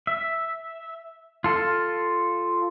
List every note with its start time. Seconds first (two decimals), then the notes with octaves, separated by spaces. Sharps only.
0.07 E5
1.44 F4 A4